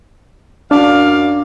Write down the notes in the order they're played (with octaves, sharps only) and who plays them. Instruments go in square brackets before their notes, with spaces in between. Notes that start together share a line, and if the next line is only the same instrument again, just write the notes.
[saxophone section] F#2 D5 F5 [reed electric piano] D4